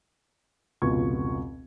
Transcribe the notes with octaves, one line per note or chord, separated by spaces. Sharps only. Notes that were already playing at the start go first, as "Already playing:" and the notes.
F1 C#2 B2 F4 C#6 G#6